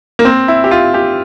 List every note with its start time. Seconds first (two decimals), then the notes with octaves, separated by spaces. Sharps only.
0.19 A#3
0.25 C4
0.48 E4
0.64 G4
0.71 F4
0.94 G4